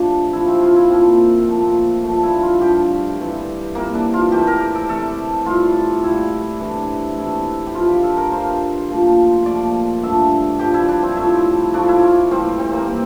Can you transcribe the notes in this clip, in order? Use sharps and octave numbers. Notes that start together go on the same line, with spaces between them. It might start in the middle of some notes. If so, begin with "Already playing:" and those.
Already playing: C3 F3 A3 D4
C3 F3 A3 E4
C4
F4
E4
A#2 F3 A3 C4
A#2 F3 A3
G2 D3 F3 A3
E4
F4
G2 D3 F3 A3 G4
C3 E3 G3
C3 E3 G3 A#3
D4
F4
C3 E3 A3 G4
A#4
G4
A4
C3 E3 A3 A4
A2 G3 F4
A2 G3 E4
C3 E3 A3 D4
C3 E3 A3 E4
G4
G2 F3 A3 F4
G4
A4
A#4
G2 F3 A3 C5
A#2 F3 A3
A#2 F3 A3 D5
G2 D3 F3 A3 E5
G2 D3 F3 A3 G4
E4
D4
C4
A2 F3 A3 E4
A2 F3 A3 D4
E4
F4
A2 E3 G3 C4
C4
A#3
E3 G3 C4